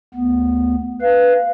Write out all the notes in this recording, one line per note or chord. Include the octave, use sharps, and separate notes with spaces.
D2 B3
B4 F5